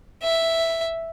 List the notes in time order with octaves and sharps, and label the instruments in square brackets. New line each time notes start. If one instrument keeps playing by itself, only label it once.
[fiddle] E5